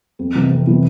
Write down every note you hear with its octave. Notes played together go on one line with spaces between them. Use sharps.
F2
C3 E3
F2
C3 E3